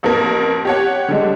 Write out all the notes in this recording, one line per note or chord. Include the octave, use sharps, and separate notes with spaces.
A1 F2 A#3 A#4
G4 C#5 F#5
D3 G3 G#3